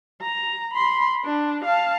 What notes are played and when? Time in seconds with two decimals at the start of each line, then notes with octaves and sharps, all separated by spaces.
0.22 A#5
0.74 B5 C6
1.25 D4
1.65 F5 A5